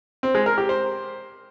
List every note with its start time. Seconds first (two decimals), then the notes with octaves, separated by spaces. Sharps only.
0.23 C4
0.35 G#3
0.46 A#4
0.58 G4
0.69 C5